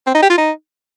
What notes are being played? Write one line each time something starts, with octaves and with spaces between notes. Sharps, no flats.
C4
D#4
G4
F4
D#4